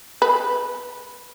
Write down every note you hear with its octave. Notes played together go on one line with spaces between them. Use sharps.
B4